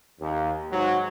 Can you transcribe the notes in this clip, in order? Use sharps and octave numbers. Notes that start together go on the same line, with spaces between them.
D#2
G#2 F#3